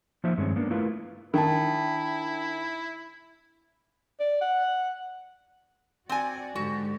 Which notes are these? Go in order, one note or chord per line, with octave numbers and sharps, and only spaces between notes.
F3 F#3 A#3 D#4 C5 E5
G2 D#3 G#3 C4 C#4
A#3 B3 D4
A3 E4 F4 A#4 B4
D#3 D4 E4 G5 A5
D5
F#5
C4 F#4 D5 G#5
G#2 D3 F#4 G4